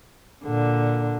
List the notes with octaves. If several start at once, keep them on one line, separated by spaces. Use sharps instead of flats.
A#2 D3